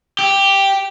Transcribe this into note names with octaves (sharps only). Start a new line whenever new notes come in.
G4